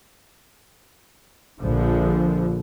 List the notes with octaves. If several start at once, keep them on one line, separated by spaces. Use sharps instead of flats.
A#1 D3 F3